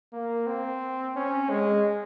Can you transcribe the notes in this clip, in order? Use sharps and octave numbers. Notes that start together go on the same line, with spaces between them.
A#3
C4
C#4
G#3